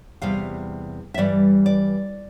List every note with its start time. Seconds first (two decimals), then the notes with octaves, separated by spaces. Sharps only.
0.22 E2 C3 G3 F5
1.14 E5
1.18 G2 E3 G3 D5
1.66 D5